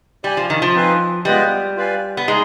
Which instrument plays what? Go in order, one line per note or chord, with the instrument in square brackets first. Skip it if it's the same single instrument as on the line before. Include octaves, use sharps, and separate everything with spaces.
[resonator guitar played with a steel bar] G3 [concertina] G4 D5 G#5
[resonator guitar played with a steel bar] F3
D#3
F3
[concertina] C4 D#4 B4 F5 G#5
[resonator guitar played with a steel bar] G3 [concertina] G#3 B3 F4 B4 D#5
[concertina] F4 B4 D5 F5 G#5
[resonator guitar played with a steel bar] B3
[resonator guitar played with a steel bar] G#3 [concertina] D#4 G#4